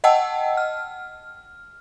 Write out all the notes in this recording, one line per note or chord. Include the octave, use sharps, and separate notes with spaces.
D#5 F#5 G5 A5 E6
F6